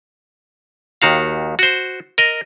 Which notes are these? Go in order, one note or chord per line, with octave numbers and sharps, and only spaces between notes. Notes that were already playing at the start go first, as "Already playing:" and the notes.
D#2 D#3 F#4 F5
F#4 C5
A#4 D#5